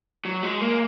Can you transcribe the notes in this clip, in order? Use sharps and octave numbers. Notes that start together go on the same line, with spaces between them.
F#3
G#3
A#3